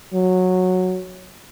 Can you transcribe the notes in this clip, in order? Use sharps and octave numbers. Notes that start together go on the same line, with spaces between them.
F#3